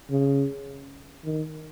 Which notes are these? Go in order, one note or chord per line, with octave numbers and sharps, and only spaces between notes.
C#3
D#3